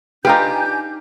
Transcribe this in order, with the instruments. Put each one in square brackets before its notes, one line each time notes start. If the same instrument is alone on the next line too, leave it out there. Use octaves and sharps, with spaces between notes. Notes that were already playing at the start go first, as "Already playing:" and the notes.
[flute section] D4 G#5 G6 [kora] D#4 F4 B4 [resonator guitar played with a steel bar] G4